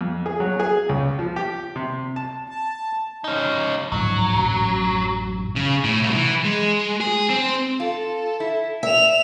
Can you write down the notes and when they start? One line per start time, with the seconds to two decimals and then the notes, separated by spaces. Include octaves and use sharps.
0.01 F2
0.26 G#4
0.40 F#3
0.60 G#4
0.89 C#2
1.19 F3
1.36 G4
1.76 C3
2.16 A5
2.49 A5
3.24 C#4 D#4
3.92 D1 G#2 F3 F#3
4.35 A1 F#2
5.56 C#3
5.84 A2
6.02 C2
6.16 E3
6.45 G#3
7.00 G#4
7.30 C4
7.80 F4 A4
8.40 E4
8.83 E5 E7 F7